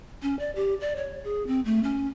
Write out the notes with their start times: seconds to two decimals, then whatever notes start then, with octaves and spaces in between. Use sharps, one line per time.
0.22 C#4
0.39 D5
0.55 G4
0.81 D5
0.96 C#5
1.24 G#4
1.47 C4
1.65 A3
1.83 C#4